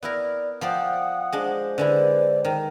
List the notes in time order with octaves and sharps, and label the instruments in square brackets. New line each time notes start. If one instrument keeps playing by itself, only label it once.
[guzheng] B3 E4 A#4 [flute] D5
[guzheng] F3 C5 D5 [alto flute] F#5 [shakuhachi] G5 [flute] D#6
[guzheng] G#3 D4 [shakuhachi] C5
[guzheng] D3 G#3 E4 [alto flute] B4 [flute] D5
[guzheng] D#3 [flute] G5 [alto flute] A#5